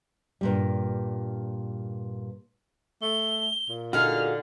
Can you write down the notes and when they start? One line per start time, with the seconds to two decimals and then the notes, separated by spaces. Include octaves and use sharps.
0.41 G2 A#2 G3
3.02 A3 G7
3.69 A#2
3.93 D3 D#4 F#4 G#4 F5 F6